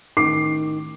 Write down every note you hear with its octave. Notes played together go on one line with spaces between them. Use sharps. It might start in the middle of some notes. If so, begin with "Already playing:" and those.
A1 D#3 D6 C7